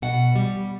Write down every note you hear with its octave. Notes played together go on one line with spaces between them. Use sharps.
B2 F#5
G3